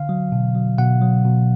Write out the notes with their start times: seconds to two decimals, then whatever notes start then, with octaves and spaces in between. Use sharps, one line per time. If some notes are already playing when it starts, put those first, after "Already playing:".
Already playing: D3 F5
0.09 F#3
0.32 B2
0.55 F#3
0.78 B2 F#5
1.02 F#3
1.25 B2